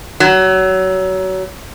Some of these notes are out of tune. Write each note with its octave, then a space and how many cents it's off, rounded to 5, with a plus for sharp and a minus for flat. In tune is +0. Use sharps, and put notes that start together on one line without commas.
F#3 +25